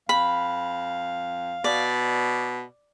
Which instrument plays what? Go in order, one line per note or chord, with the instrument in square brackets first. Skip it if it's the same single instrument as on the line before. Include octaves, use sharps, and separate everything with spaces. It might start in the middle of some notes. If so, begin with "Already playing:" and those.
[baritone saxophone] F2 [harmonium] F5 [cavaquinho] B5
[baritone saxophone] B2 [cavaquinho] D5